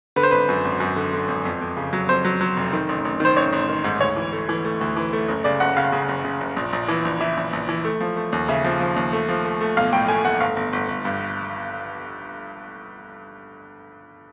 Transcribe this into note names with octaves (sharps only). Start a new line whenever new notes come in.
D3 B4
C5
G#1 B4
F#2
G#1
F#2
D3
D3
G#1
F2
F2
C#3
F#3
F2 C5
F#3
F#3
F1
D#3
A1
A1
D#3 C5
A1 C#5
A1
D#3
G#2
D2 C#5
E3
A3
E3
A3
D2
E3
A3
F#1
C#3 D5
F#1 F#5
C#3 F5
C#3
F#1
C#3
F#1
A#1
A#1
E3
A#1
E3 E5
A#1
A#1
E3
A3
F3
A3
D#2
C#3 E5
F3
F3
D#2
A3
F3
A3
A3
B1 F5
A2 G5
A3 G#5
A3 F#5
G1 F5
G1
G1
G1
G2